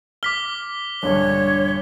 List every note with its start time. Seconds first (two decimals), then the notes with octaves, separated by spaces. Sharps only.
0.23 D6 F6 B6 G7
1.03 A#1 G2 D3 C#5